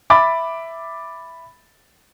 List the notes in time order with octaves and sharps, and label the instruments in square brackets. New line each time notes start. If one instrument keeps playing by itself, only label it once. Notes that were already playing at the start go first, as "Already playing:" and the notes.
[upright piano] E5 B5 D6 A6